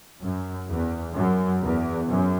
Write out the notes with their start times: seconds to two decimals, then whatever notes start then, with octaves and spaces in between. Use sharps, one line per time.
0.21 F#2
0.68 E2
1.14 F#2
1.62 E2
2.08 F#2